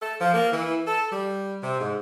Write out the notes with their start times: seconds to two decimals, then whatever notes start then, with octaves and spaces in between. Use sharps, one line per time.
0.01 A4
0.20 F3
0.33 A#3
0.51 E3
0.87 A4
1.11 G3
1.62 C3
1.80 G#2